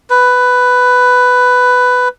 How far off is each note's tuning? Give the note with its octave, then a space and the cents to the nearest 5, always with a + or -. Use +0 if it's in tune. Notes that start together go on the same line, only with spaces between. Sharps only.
B4 +10